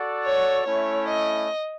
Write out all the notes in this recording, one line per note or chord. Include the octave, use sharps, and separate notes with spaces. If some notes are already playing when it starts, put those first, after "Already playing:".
Already playing: F#4 A4 D5 F#5
C#5
A3 C#4 E4 C#5
D#5